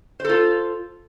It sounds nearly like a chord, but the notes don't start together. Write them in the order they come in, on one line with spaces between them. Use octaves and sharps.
C5 A4 F4